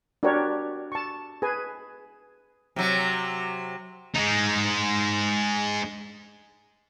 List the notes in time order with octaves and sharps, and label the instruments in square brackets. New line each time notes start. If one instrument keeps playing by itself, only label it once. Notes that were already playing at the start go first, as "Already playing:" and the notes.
[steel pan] D4 F#4 G4 A#4 C#5 D5
A5 C#6
G#4 B4 G#5
[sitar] C3 F#3
[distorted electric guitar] G#3 D#4